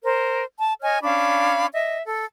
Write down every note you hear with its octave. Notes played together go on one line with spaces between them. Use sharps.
A#4 C5
A5
C#5 D#5 G#5 F6
C#4 D4 F5 B5
D#5 E5
A4